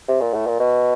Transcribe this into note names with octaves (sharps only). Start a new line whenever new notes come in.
C3
A#2
A2
A#2
B2